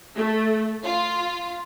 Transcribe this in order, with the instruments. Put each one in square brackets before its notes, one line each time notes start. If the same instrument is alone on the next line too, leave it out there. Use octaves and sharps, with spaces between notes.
[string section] A3
F4